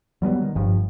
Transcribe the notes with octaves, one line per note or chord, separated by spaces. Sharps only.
F#3 G3 A#3 B3
D#3
G1 G2 F3